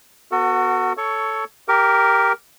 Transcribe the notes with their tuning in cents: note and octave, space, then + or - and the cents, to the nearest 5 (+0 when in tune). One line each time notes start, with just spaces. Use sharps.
B3 +15 F#4 +0 A4 +40
A4 +0 C#5 +5 C#6 +15
G4 +0 A#4 +0 D6 -30